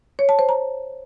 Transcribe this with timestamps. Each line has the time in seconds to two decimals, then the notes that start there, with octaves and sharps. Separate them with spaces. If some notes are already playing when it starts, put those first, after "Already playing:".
0.19 C#5
0.29 A5
0.39 C5
0.49 A#5